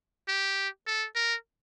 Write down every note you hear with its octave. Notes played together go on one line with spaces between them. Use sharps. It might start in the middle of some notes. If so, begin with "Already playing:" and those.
G4
A4
A#4